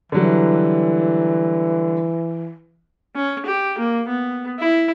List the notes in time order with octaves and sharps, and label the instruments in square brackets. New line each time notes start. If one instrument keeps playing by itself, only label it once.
[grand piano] D3 F#3 G3 [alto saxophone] E3
[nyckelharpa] C#4
G4
A#3
B3
E4